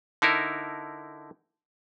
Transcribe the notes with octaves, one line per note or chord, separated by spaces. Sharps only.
D3 D#4 E4 A#4